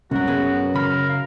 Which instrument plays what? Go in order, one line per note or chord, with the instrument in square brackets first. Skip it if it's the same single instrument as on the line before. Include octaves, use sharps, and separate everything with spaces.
[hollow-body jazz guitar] C2 A#4 [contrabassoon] F#2 [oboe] F#4
[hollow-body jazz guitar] B3 G#4 B4
[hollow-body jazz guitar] C#3 B5 [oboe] A#4
[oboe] F5